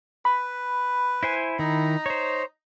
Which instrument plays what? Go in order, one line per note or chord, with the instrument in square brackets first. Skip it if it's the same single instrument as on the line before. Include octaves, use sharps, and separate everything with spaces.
[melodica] B4 [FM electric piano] B5
[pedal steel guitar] E4 C5 G#5
[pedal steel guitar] D#3 E4 [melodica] D#4 A#5
[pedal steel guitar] C5 C#5